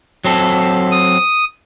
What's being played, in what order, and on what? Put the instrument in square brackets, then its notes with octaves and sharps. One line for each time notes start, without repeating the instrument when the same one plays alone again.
[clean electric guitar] F#3 C4 A4
[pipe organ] D#6